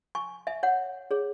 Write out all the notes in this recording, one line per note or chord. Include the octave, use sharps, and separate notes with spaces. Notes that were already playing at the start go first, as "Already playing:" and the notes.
G#5 C#6
E5 G#5
C#5 F#5
G#4 C#5